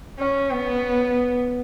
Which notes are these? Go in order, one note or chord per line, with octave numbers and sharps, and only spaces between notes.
C#4
B3